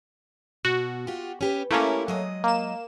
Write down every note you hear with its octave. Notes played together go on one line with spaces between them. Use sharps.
B2 F#4
F4 G4
C#4 G4 B4
A3 A#3 C#4 E4 G4
F#3 G#3 D#5
A#3 E7